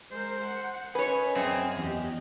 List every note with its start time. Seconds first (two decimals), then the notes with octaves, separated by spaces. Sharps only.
0.12 G#3 A#4 C5
0.45 F#5
0.95 C#4 B4 C#5 D#5 G#5
1.35 F#2 C4 G#4
1.77 E2 G4 D#5